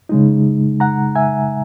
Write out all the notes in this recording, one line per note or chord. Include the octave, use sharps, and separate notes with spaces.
C#3 G#3 D#4
F#5 A#5
E5 G#5